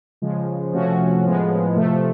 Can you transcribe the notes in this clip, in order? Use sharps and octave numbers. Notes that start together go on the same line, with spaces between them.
C#3 F3 G#3
C3 F3 A3 C#4 F#4
A2 F3 G#3 B3
C3 F3 A3